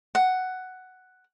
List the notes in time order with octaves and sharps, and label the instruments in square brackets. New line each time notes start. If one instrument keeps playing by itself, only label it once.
[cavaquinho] F#5